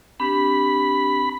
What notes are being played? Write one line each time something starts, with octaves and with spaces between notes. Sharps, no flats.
C4 D4 G4 B5